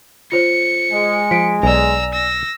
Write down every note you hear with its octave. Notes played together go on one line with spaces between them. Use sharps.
F4 C5 C#5 C#7
G#3
F3 B6 D7
B1 D5 G#5 A#5 E6
E6 A#6